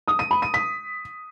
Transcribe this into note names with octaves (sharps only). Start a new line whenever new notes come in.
D#6
D#7
B5
D#7
B6